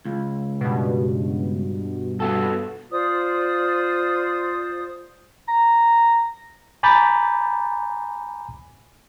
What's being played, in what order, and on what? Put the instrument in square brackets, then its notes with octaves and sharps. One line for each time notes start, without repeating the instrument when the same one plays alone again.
[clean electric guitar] C#2
[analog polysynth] G2 B2
[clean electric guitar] B3 F#4 A4
[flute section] F4 C5 D5 D#6
[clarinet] A#5
[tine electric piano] G#5 A#5 B5 D6 G6 A6